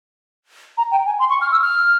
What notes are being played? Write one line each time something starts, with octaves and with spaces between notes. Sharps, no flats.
A#5
G5
G#5
C6
C#6
F6
E6
F6